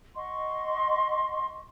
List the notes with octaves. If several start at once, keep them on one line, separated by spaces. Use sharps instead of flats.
D#5 F#5 C6 C#6